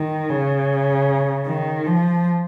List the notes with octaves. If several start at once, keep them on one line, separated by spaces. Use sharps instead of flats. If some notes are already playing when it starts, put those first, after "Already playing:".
Already playing: D#3
C#3
D#3
F3